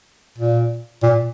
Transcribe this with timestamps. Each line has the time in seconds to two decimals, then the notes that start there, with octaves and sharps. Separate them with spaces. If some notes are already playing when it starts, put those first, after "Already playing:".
0.38 A#2
1.03 A#2